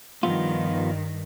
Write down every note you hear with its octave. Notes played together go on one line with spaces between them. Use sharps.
G2 D#3 F3 B3 F4